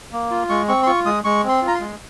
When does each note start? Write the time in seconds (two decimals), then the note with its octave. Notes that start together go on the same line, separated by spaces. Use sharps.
0.12 A#3
0.31 F4
0.49 G#3 C#6
0.68 C4 C#6
0.83 C6
0.87 F4 C#6
1.06 G#3 D#6
1.24 G#3 C#6
1.44 C4
1.49 C6
1.62 F4
1.68 A#5
1.74 C6
1.81 G#3